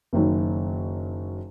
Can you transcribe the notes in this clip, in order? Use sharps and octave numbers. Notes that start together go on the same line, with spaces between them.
F#1 D#3 F#3